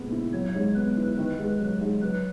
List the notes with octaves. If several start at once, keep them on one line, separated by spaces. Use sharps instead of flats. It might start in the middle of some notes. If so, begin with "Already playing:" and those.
Already playing: A#2 G#3 B3
E4
F#3 C#5
G#2
B3 B4
E4
D#3
G#2
F#3
G#2
F#3 B4